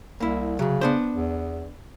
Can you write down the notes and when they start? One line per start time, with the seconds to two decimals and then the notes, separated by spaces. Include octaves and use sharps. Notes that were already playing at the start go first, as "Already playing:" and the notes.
0.20 C2 A#3 E4
0.59 C2 C#3 F#3
0.81 B3 D4 C5
1.14 E2